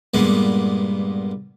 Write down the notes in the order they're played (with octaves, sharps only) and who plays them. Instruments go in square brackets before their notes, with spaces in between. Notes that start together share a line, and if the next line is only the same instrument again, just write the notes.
[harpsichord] G2 A#2 G#3 B3